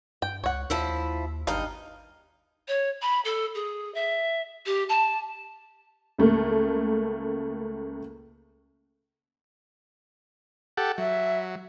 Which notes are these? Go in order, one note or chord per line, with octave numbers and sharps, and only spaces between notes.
G2 G5
C#2 C#5 F#5
D#2 F3 E4 E5
G#1 G2 D#4 D#5 F5
C#5
B5
A4
G#4
E5
G4
A5
C#2 A3 A#3
G4 A4 F#5
F#3 E5